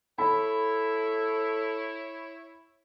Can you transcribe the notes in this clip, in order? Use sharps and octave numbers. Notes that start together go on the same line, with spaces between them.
E4 A4 C#5 B5